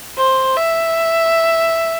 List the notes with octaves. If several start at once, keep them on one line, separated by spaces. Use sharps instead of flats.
C5
E5